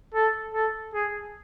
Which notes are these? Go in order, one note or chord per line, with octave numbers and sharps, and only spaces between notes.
A4
A4
G#4